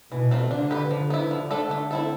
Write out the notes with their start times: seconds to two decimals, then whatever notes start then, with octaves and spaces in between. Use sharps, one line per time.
0.12 B2 E3
0.31 A3 C4 F4
0.51 D3 D4
0.71 G4 B4
0.90 D3 F3
1.10 B3 E4
1.31 F3
1.51 A3 D4 A4
1.71 A3
1.91 C4 E4 A4